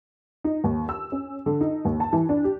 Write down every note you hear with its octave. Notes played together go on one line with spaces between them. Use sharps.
D#4
D#2
E6
C#4
D3
D#4
D#2
A5
E3
D4
G4